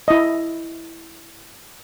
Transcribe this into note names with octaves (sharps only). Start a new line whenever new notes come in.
E4 D#5